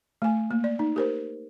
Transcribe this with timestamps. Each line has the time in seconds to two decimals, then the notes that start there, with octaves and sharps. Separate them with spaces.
0.22 A3 G#5
0.51 A#3
0.64 D5
0.79 D#4
0.96 G4 A#4 C5